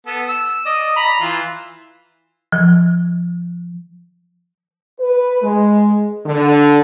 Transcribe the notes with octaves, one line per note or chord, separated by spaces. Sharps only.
B3 A4
E6
D5 D#5
A#5 B5
E3 F4
F3
B4
G#3
D3